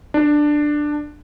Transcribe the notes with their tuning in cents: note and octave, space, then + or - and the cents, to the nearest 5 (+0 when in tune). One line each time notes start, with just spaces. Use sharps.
D4 +10